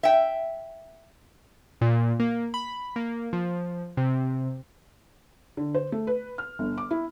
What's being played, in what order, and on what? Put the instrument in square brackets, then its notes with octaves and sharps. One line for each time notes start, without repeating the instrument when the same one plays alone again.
[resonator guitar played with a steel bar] E5 G5
[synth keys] A#2
A#3
B5
A#3
F3
C3
[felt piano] D3
C5
A3
B4
F6
G1
D6
E4